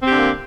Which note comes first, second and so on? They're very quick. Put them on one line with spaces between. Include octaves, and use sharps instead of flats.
C4 G4 D3 A#3